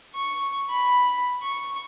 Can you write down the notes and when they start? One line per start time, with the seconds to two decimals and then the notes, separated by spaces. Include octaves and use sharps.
0.15 C#6
0.70 B5
1.43 C#6